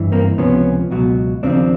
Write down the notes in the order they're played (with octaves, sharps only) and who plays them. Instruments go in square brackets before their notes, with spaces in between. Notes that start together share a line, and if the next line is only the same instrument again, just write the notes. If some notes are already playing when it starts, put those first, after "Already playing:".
Already playing: [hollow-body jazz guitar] G2 E3
A#3 C4
C#2 C3 F3 B3 C#4
C#2 B2 F#3
D#2 C#3 F3 C4 D4